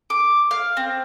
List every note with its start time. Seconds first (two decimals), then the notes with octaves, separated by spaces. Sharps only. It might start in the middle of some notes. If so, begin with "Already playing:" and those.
0.10 D6
0.51 F5
0.77 C4